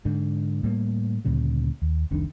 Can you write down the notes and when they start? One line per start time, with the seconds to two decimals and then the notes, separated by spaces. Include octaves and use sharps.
0.05 G#2 D3
0.63 A2 G3 A#3
1.25 D2 A#2 C#3 G3
1.82 D#2
2.11 F1 C2 D#3 D4